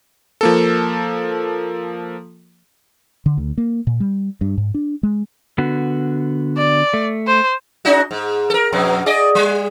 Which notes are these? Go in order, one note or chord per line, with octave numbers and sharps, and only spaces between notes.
F3 A#3 A4
D3
D2
A#3
A#2
G3
G2
G#2
D4
G#3
D3 B3 F#4
D5
A3
C5
C#4 D#4 F#4
G#2
A4 A#4
F2 B2 F#3
G#4 D5 D#5
G3